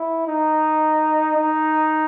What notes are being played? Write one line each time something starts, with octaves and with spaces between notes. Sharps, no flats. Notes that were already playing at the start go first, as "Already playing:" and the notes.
Already playing: E4
D#4
D#4